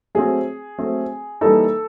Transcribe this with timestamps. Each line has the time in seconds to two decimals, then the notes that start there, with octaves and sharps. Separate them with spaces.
0.15 F#3 A3 C4 G#4
0.78 F#3 A3 C4
1.41 E3 G3 A#3 D#4 A4